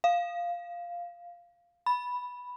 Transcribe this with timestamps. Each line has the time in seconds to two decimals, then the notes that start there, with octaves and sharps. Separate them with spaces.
0.04 F5
1.86 B5